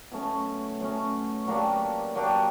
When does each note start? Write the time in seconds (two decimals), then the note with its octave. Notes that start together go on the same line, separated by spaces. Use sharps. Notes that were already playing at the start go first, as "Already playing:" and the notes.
0.12 B2 F#3 A3 C#4
0.80 B2 F#3 A3 C#4
1.48 F#3 A#3 D4 G4
2.15 F#3 A#3 D4 G4